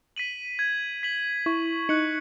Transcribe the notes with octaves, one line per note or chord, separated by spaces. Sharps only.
B6 D#7 F#7
G#6
B6 F#7
E4 C#6
D#4 F#6 C#7 F#7